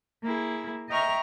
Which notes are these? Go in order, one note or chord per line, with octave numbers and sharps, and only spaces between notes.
A#3 E4 G#4
D#5 E5 G5 A#5 C#6 F6